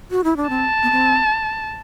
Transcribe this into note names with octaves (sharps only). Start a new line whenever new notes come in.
F#4
E4
D4
C4 A5
B3
C4